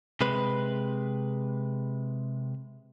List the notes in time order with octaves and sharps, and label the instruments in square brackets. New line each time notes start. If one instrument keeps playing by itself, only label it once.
[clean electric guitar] C3 G#3 B4